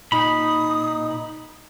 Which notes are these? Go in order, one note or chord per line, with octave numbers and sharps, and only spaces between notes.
A#2 D#4 B5 D#6